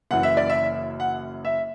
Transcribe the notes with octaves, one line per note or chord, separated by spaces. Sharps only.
F#1 F#2 E3 F#5
E5
D5
E5
F#5
E5